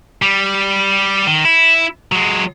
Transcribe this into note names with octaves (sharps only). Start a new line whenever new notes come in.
G3
D#3
E4
F#3 G#3